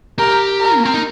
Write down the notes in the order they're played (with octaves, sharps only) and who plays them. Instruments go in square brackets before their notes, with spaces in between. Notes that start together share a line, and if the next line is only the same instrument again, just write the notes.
[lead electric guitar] G4 [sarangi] A#4
[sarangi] A#4
[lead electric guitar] A#3
C4
D#4